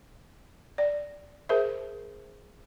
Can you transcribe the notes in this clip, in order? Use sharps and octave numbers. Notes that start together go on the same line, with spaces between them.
D5
G#4 A#4 C5 E5